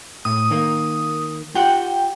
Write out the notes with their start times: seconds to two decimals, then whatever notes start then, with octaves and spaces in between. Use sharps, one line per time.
0.25 A2 D#6
0.50 D#3 A#3
1.55 F4 G4 F#5 G5